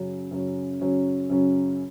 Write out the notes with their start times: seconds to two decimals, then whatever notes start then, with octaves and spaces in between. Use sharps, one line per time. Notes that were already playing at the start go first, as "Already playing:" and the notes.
Already playing: F#2 C#3 F#3 C#4
0.31 F#2 C#3 F#3 C#4
0.81 F#2 C#3 F#3 C#4
1.30 F#2 C#3 F#3 C#4